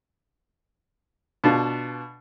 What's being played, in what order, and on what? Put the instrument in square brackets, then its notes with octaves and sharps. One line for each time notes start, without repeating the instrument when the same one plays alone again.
[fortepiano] B2 D4 F4